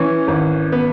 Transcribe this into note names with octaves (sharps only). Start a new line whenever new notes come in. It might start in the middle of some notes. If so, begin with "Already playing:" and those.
Already playing: E3 C#4
G#1
B3